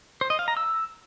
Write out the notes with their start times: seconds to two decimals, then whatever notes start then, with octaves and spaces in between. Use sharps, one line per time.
0.21 C5
0.30 D#5
0.39 F5
0.48 A#5
0.57 E6